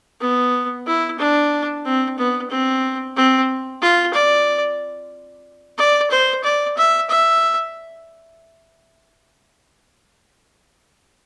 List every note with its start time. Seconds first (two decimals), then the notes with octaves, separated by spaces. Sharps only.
0.21 B3
0.87 E4
1.19 D4
1.85 C4
2.18 B3
2.50 C4
3.16 C4
3.82 F4
4.14 D5
5.78 D5
6.11 C5
6.44 D5
6.77 E5
7.10 E5